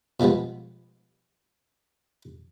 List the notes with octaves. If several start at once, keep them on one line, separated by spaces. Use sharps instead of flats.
B2 F3 G3 G#3 B3